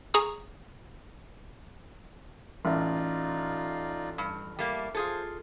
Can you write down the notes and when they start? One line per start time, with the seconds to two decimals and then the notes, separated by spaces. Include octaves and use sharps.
0.14 G#4 A#5 C#6 D#6
2.65 A1 D#4 F4 D5
4.18 G2
4.59 G3 A3 A#3
4.95 F4 G#4 A4 C5